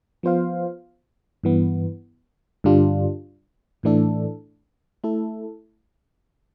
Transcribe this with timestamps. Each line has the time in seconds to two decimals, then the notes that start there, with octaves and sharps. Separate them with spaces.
0.23 F3 B3 F4 C5 F5
1.44 G2 E3 B3
2.64 G2 D3 G3 D4 F4
3.83 A2 E3 A3 D4 A4
5.04 A3 E4 A4